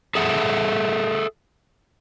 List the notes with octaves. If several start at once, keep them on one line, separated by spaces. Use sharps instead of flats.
G#4 A4 E5 F#5